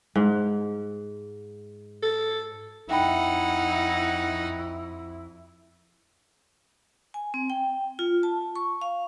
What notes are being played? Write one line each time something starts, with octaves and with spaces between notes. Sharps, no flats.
G#2
A4
F2 D#4 E4 E5 F#5 G5 B5
G#5
C4
G5
F4
A5
C#6
F5